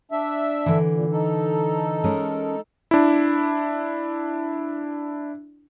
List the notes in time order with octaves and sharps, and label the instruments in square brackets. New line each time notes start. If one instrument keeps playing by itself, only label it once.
[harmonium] D4 E5
[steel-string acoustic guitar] D3 E3
[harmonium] A#2
D#4 A4
[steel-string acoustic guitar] G#3 C#4 A#4
[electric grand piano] D4 E4